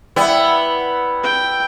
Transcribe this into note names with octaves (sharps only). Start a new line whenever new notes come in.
G3 B3 E4 B4
G5